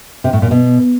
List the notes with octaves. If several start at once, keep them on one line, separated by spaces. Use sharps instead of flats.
C3
A2
A#2
B2